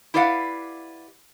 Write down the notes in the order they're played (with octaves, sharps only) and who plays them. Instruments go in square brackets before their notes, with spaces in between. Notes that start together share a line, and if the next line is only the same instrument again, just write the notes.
[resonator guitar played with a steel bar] E4 G4 B4 D5 F5 F#5